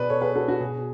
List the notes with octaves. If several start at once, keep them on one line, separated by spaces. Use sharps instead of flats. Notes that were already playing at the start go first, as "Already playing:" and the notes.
Already playing: B2 G#4 B4 D5
A4 C#5
G#4 B4
F#4 A4
F#4
B2 G#4